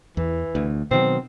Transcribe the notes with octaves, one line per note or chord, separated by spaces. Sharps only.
E2 E3
D2
B2 D#3 F#3 C4